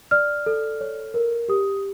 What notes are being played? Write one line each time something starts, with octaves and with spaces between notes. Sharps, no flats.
D5 F6
A4
C#5
A#4
G4 D#6